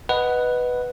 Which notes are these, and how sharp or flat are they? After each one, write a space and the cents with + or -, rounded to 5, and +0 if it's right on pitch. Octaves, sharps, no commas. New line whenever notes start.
B4 +0 D#5 +0 F#5 +0